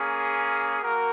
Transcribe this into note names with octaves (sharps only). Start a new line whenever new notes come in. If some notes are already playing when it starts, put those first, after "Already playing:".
Already playing: A#3 C#4 G#4
A#3 F#4 A#4